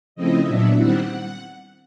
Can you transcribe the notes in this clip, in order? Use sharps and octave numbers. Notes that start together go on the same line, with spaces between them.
C#3 F3 A3 C4 E4 D#5
A#2 F#3 B3 D4 E5
D#3 G3 C4 E4 F#5